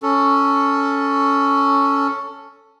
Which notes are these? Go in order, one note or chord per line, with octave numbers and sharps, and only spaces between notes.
C#4 A4